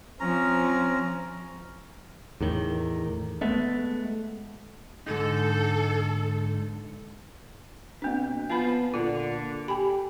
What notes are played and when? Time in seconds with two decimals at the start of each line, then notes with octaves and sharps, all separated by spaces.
0.20 F3 C4 C#4 A#5
2.40 E2 A2 D#3
3.41 G#3 A3 B3
5.06 G#2 D3 D#4 A4
8.02 B2 A#3 C4 D4
8.50 F3 B3 G#5 A5 B5
8.94 A#2 D3 F4
9.68 G4 G#5 B5